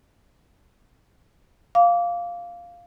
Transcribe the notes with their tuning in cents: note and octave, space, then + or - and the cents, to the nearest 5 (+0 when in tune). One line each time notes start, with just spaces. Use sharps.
F5 +0 D6 -20